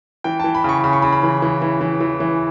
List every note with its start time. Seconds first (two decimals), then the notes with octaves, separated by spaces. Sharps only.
0.24 E3 G5
0.40 E3 A5
0.55 B5
0.64 C#3 C#6
0.84 C#3 B5
0.93 C#6
1.02 C#3 B5
1.13 B5
1.23 E3
1.42 E3
1.62 E3
1.81 E3
2.01 E3
2.20 E3